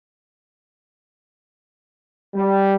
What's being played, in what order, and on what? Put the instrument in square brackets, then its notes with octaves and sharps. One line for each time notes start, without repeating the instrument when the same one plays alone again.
[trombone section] G3